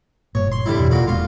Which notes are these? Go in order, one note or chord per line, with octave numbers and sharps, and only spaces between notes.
F#1 G2 A#2 C#5
C6
D3 G3 E4
F2 B2 E3
A#2 F#4
E1 G#3 B3 F4